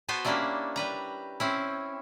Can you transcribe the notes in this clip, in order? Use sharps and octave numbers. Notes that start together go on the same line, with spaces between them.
B3 F#4 B4 C5 G#5 A5
G3 A#3 C#4 D4 E4
G3 B4 A#5
C4 C#4 E4